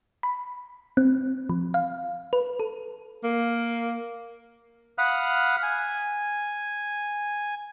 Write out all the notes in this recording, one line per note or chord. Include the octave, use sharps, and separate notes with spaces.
B5
C4
F3
F5
B4
A4
A#3
F5 F#5 B5 D#6 F6 F#6
G#5